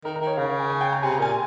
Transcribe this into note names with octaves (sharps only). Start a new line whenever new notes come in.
D#3 A#4
A#4
D#3
C#5
C#3 F5
F5
G#5
G#5
G5
A#5
C3 G#5
A#5
A#2 G#5